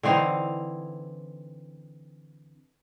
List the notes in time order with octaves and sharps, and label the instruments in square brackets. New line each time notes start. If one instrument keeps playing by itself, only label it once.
[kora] D3 E3 C4 D#4